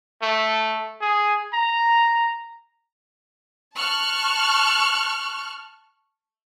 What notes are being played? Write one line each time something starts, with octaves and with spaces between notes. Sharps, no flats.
A3
G#4
A#5
A5 C#6 F6 F#6